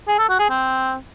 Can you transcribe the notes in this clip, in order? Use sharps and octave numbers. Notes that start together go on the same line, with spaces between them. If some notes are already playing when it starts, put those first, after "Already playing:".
G#4
A4
F#4
G#4
C4